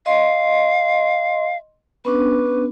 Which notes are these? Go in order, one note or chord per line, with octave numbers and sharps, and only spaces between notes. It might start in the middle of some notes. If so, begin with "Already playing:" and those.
D#5 F5 C6
B3 C#4 D4 B4